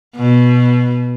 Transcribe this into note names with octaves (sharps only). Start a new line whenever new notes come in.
B2